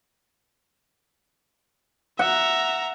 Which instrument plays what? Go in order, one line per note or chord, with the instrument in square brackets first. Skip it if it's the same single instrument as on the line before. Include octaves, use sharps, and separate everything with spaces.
[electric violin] E5 A#5 [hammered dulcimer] F#5